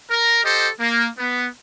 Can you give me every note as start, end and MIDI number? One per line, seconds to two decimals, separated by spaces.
0.10 0.41 70
0.44 0.68 67
0.44 0.68 69
0.44 0.68 72
0.44 0.68 75
0.80 1.06 58
1.18 1.46 59